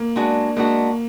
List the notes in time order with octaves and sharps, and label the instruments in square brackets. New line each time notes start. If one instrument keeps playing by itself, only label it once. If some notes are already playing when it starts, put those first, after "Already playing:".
Already playing: [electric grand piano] A#3
[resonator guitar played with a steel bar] G#3 B3 D4 F#4
[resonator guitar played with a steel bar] G#3 B3 D4 F#4 [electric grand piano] A#3